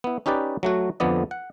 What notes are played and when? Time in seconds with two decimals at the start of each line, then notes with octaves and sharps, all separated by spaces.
0.04 B3 E4
0.26 C#4 D#4 G4 B4 D5
0.63 F#3 A3 F#4
1.00 F2 D3 F3 B3 D5 D#5
1.31 F#5